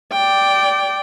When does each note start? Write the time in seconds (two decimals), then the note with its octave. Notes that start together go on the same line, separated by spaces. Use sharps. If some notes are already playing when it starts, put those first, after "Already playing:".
0.13 D5 G5